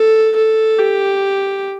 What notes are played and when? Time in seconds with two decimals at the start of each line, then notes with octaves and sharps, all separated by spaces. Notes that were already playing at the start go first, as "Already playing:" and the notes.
Already playing: A4
0.36 A4
0.79 G4